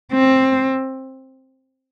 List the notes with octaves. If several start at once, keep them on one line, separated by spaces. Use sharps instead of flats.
C4